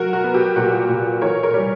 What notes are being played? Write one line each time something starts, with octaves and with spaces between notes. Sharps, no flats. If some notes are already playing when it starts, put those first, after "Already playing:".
Already playing: F#3 F#4 A#4
F#4
B3
G4
A#2 F#4 A#4
A#2
E3 A#4 C#5
A#4 C#5
G3